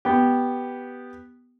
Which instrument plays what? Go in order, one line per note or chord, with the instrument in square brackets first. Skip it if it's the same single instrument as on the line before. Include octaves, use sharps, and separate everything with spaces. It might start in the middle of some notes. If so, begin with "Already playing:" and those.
[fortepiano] B3 G4